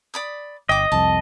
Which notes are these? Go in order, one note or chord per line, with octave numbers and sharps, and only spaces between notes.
D5 B5 D#6
G1 D#5 G5 D6
C2 F2 A5